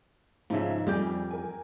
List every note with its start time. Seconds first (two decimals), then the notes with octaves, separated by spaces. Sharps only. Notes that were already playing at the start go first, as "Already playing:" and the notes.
0.50 G#2 C#3 F3 E5
0.87 F2 G3 G4 G5 G#5
1.31 A#4 G#5